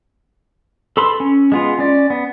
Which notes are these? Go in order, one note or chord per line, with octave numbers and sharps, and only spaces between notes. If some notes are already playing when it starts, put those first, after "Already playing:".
A4 B4 B5 C6 E6
C#4
G#3 B3 F4
C#4 D5
B3